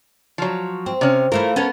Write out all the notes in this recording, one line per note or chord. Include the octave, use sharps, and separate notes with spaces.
F3 F#3
C4
C3 C#4
E3 A3 F4 A#4
B3 C#4 A4 A#4